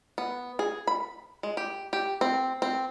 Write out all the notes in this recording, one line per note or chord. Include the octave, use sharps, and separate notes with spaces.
B3
G#4
B5
G#3
G4
G4
C4
C4